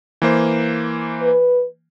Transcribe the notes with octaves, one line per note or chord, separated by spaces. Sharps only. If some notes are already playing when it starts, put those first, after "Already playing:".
E3 A#3 C5
B4